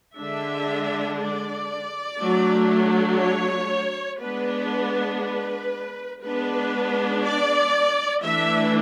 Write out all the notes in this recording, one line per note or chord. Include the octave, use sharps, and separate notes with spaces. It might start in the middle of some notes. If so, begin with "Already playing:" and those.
D3 G#3 D4 E5
D5
F#3 A3 D4
C#5
G#3 B3 D4 B4
B4
G#3 B3 D4 B4
D5
E3 A3 D4 E5